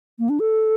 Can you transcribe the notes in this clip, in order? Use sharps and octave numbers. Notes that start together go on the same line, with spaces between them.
A#3
D4
A4